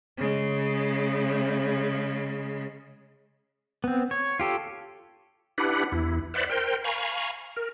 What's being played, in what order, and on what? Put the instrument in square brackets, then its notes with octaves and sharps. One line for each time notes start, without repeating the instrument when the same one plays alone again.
[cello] C#3 G#3
[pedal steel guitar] B3 C4
C#5
F4 G4 A4
[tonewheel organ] D4 E4 G4 B4 F#5
E2 E4
B4 C5 D5 E5 F#5
A#4 C5 G5
F5 G#5 A#5 B5 C#6
A#4